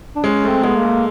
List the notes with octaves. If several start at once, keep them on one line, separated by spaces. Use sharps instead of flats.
D4
G#3 C#4
A3
C4
G#3 B3
A#3
A3